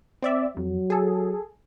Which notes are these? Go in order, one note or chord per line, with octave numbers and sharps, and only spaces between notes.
C4 D5 E5
F2 F#3
G#4 A4